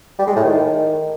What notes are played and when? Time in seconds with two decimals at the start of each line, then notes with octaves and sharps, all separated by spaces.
0.19 G3
0.27 G#3
0.36 A2
0.44 D#3